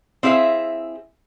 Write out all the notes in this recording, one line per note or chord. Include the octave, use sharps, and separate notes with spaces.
C4 E4 G#4 E5 F5